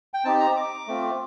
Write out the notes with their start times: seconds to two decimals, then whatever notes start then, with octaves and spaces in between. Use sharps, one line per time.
0.14 G5
0.24 C4 D#4 G4 A5
0.40 A#5
0.56 D6
0.87 A3 C4 F4